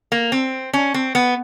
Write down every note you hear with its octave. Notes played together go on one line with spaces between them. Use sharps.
A#3
C4
C#4
C4
B3